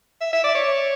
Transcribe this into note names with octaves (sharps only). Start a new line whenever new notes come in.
E5
E5
D5
C#5